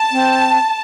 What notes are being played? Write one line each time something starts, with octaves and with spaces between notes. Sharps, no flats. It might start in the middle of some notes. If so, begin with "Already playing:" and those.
Already playing: A5
C4